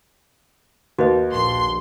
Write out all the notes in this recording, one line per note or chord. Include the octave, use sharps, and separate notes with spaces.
D#2 F#4 B4 D#5
A#1 C6